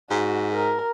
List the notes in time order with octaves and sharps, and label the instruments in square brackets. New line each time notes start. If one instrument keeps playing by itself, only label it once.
[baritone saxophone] G#2 [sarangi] F#4
[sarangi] A#4